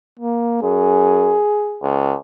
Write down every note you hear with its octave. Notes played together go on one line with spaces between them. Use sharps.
A#3
F#2 G#4
C#2